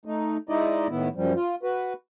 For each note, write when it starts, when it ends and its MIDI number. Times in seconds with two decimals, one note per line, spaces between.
0.05 0.37 57
0.05 0.37 63
0.49 0.87 56
0.49 0.87 63
0.49 0.87 64
0.49 0.87 74
0.49 0.87 75
0.90 1.09 45
0.90 1.09 51
0.90 1.09 59
0.90 1.09 64
1.15 1.33 42
1.15 1.33 53
1.15 1.33 55
1.36 1.55 65
1.63 1.93 66
1.63 1.93 71